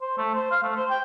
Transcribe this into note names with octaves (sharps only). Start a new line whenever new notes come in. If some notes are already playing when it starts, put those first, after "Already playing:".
C5
A3
C5
F5
A3
C5
G5